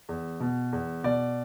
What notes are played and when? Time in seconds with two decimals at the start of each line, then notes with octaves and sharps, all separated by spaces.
0.09 E2
0.40 B2
0.73 E2
1.04 B2 D5